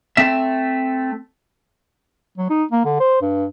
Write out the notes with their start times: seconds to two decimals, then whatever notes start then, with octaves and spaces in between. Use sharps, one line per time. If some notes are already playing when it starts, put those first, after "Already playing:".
0.17 A3 C4 E5
2.38 F#3
2.50 D#4
2.71 A#3
2.85 D3
3.00 C5
3.22 G2